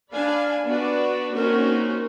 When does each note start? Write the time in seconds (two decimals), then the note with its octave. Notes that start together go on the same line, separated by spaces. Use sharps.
0.13 D4 D5 F5 G#5 B5
0.64 B3 D4 F#4 B4 D5
1.32 A#3 C4 C#4 D#4 F#4 A#4